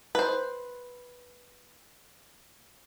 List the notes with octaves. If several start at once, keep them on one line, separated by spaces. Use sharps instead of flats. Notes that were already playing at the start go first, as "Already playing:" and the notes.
B4 C5